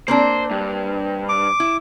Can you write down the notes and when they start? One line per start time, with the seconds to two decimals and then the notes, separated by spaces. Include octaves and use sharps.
0.08 A#3 C4 D4 C5
0.51 G2
1.29 D6
1.60 E4